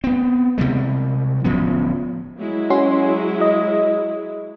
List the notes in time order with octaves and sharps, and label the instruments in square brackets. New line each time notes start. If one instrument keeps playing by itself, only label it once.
[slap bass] B3 C4
C3 E3 G3 G#3
D1 F3 B3 C#4
[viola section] F#3 G#3 E4
[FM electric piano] C#4 F#4 C6
D#5